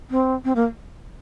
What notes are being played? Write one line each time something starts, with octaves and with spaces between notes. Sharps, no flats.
C4
C4
A#3